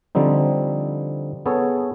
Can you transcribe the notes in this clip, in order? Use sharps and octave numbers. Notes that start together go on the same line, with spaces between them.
D3 F3 G3 C4 D#4
B3 G#4 A4 C#5